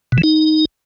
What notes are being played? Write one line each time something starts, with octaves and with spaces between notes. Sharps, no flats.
B2
E3
D#4